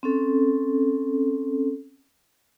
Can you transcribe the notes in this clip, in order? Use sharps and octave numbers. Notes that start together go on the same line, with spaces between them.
C4 C#4 A4